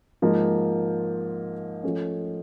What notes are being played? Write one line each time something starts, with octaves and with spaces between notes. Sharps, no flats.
G#2 F3 A#3
F3 A3 C#4